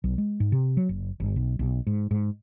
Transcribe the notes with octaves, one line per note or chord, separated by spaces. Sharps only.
B1
G#3
G#2
C3
F#3
F#1
G1
B1
B1
G#2
G#2